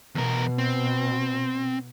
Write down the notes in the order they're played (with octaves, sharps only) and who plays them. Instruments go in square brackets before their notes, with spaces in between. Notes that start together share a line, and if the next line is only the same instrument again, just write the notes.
[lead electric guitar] E2 A#4 [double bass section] B2
[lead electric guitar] C4